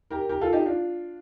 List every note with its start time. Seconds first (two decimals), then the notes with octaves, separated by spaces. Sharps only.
0.11 G4 A#4
0.29 G4 A#4
0.41 F4 A4
0.53 D#4 G4
0.66 D4 F4